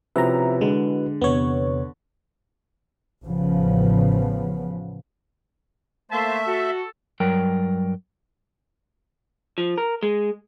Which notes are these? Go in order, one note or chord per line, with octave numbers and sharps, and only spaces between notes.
C3 F3 C#4 E4 F#4 B4 E5 A#5
D3 G#3
E2 C3 B3 C#5
A1 C#3 F3 B3
A3 A#3 C5 E5 A5 C6
F#4 A4
G2 F#3 A#4 G5
F3
A#4
G#3